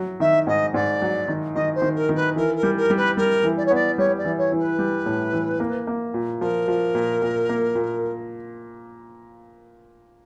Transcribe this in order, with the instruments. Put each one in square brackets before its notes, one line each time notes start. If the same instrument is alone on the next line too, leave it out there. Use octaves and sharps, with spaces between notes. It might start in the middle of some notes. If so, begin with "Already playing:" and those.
Already playing: [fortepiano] F#3
[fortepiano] D#3 [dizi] E5
[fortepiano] G#2 [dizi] D#5
[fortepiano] G#2 [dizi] D5
[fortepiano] F#3
D#3
[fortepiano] D#3 [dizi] D#5
[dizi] C5
[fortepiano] D#3
[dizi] A#4
[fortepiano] D#3
[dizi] B4
[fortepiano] E3 [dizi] A#4
[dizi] A#4
[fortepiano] G3
[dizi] A#4
[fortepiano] G3
[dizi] B4
[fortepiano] G3 [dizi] A#4
[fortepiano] E3
[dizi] D5
C#5
[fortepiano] B3 [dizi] D5
[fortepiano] G3 [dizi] C#5
[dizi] D5
[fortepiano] E3
[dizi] C#5
[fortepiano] E3
[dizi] B4
[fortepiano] G3
A2
E3
A#3
A#3
A#2
[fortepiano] F3 [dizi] A#4
[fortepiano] F3
A#2
A#2
A#3
A#2